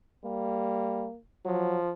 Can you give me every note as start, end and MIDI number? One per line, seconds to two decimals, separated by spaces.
0.24 1.07 55
0.24 1.18 58
1.45 1.91 53
1.45 1.77 54